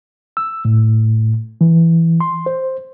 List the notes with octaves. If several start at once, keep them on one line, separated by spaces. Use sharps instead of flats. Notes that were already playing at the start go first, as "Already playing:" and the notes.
E6
A2
E3
C6
C5